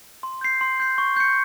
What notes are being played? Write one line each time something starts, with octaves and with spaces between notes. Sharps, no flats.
C6
G6 C7
C6
G6 C7
C#6
G6 C#7